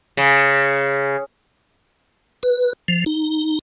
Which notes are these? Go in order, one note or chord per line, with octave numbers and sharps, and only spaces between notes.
C#3
B4
F3
D#4